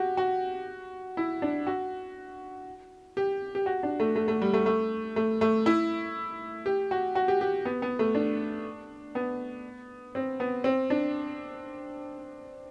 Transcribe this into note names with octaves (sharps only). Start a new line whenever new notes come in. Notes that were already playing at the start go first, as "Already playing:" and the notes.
Already playing: F#4 G4
F#4
E4
D4
F#4
G4
G4
F#4
D4
A3
A3
A3
G3
A3
A3
A3
A3
E4
G4
F#4
F#4
G4
G4
B3
B3
A3
D4
B3
C4
B3
C4
D4